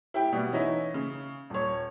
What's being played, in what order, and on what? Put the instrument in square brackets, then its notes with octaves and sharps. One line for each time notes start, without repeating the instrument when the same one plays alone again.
[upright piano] E4 G4 G5
B2 G3
E3 C#4 D#4 E4
C#3
D#1 C#5